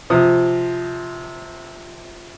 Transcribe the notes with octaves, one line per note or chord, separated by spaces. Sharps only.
C3 F3 D#6